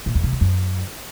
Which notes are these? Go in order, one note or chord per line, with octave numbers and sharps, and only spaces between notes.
A#2
E2
C3
E2
F#2